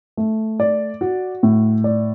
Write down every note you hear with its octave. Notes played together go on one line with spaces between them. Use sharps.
A3
D5
F#4
A2
D5